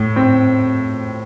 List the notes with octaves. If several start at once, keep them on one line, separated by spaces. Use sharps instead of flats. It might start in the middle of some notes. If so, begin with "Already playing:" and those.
Already playing: A2
C4